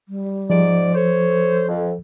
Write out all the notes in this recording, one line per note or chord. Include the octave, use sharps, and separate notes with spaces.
G3
G#2 F3 D5
A4 C5 C#5
F2